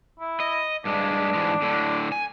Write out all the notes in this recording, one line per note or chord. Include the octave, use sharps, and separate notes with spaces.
E4
D#5
G2 G#3 D4
G#2 E3 G#3
A2 D3
G#5